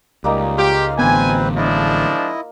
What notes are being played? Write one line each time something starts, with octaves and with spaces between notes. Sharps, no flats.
C#2 G3 A#3 D#4
F4 G4 F5
A1 D3 B3 C4 B4 C5 G#5
F3 G#3 D4 E4 D#5